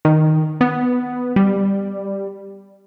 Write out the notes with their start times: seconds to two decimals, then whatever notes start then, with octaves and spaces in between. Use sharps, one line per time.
0.05 D#3
0.61 B3
1.36 G3